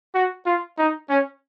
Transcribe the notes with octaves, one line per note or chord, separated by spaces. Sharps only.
F#4
F4
D#4
C#4